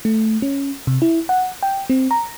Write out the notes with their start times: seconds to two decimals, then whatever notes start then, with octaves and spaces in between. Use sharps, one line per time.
0.05 A3
0.42 C#4
0.87 C3
1.02 E4
1.29 F#5
1.63 G5
1.90 C4
2.11 A#5